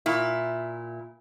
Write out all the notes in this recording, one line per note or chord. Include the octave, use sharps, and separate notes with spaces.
A#2 E4